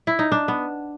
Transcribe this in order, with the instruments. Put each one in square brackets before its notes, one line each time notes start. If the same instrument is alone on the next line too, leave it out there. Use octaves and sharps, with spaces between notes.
[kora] E4
D#4
D4
B3